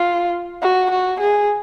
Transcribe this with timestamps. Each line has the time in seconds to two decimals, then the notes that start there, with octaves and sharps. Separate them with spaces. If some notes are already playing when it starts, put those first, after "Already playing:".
Already playing: F4
0.62 F#4
0.91 F#4
1.20 G#4